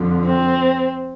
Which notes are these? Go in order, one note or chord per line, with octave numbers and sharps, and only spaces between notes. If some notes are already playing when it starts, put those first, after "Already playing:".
Already playing: F2 D3 F3
C4